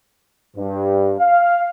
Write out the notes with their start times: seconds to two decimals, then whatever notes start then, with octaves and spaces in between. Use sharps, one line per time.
0.56 G2
1.19 F5